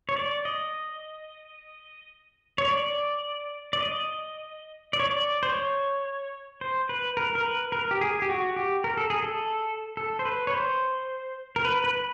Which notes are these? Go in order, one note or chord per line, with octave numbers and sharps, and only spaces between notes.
C#5
D5
D#5
C#5
D5
D5
D#5
D5
C#5
D5
C5
C#5
C5
B4
A#4
A#4
B4
A#4
G4
G#4
G4
F#4
G4
A#4
A4
G#4
A4
A4
C5
B4
C#5
C5
A#4
B4
B4